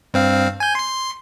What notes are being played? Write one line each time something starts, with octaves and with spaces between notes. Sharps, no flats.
G2 C4 F5
G#5 G6
C6 C7